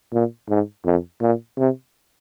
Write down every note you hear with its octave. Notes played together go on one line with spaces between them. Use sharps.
A#2
G#2
F2
A#2
C3